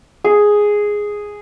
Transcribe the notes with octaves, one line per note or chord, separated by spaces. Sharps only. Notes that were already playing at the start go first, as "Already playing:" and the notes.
G#4